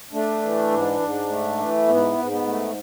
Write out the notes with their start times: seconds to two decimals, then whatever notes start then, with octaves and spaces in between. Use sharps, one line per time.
0.12 A3 D4
0.42 E3
0.71 G#2
1.00 G#2
1.29 A3
1.59 E3
1.88 G#2 B3
2.17 G#2
2.31 B3
2.46 A3